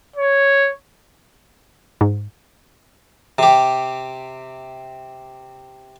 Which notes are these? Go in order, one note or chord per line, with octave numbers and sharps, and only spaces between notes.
C#5
G#2
C3 G4